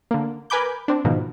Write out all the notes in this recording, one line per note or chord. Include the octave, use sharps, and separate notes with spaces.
D3 A#3
A#4 B4 G#5 B5 D6 G6
C4 D4
G#2 B2 D#3 F3